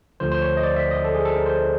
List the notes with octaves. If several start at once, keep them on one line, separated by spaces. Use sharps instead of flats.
D2 D3 F3 C5
C5
C#5
D#5
D5
E5
D#5
A4
G#4
A4
A#4
C5